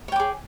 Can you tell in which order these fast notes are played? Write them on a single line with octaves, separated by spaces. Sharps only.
C#5 G5 D6 G#4